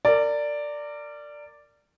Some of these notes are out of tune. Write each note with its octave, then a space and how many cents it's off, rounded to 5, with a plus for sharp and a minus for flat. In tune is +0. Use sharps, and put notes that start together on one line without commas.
A#4 -30 D5 +0